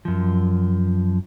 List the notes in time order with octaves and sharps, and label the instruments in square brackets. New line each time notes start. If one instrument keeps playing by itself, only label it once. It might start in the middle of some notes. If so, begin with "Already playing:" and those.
[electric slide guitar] F#2 F3